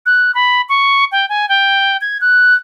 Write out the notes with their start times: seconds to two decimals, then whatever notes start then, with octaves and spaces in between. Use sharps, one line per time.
0.06 F#6
0.35 B5
0.69 C#6
1.12 G5
1.29 G#5
1.49 G5
2.01 G#6
2.21 F#6